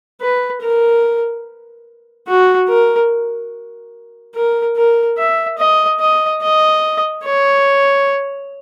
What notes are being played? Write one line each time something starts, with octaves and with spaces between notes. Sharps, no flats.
B4
A#4
F#4
A#4
A#4
A#4
E5
D#5
D#5
D#5
C#5